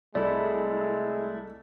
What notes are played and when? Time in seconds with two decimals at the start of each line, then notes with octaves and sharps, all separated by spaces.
0.15 C2 G#3 A3 E4 A4 D5